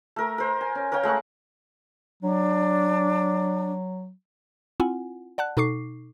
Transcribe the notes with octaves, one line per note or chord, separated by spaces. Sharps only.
A3 A#4
A#4 C5
G#5
C#4
A#4 C#5 F5 G5
G#3 A3 F#5 C#6
F#3 D4
C4 E4 F4 F#5 G#5
D5 F#5 A5 F#6
B2 D#4 A4 C#6 D6 C7